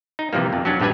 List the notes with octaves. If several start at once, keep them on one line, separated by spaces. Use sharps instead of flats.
D#4
C3 E3 F3 G3 A#3
F2
F#3 C#4 D4
A#1 G2 G3 G4 B4 G#5